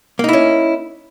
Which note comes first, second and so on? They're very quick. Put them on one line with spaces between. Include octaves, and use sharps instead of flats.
A#3 D#4 E4 C#4